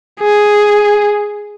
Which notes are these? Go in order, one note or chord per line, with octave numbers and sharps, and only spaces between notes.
G#4